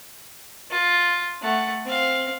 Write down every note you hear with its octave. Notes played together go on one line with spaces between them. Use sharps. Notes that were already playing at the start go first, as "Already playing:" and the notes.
F4
A3 F#5
C4 F5